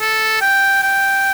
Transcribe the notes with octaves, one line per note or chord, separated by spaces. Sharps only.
A4
G5
G5